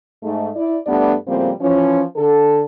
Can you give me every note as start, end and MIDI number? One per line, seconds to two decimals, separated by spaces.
0.23 0.49 44
0.23 0.49 56
0.23 0.49 57
0.56 0.78 64
0.56 0.78 74
0.87 1.15 43
0.87 1.15 55
0.87 1.15 57
0.87 1.15 59
0.87 1.15 62
0.87 1.15 74
1.28 1.51 45
1.28 1.51 49
1.28 1.51 53
1.28 1.51 55
1.28 1.51 58
1.28 1.51 60
1.61 2.03 52
1.61 2.03 53
1.61 2.03 61
2.17 2.64 50
2.17 2.64 69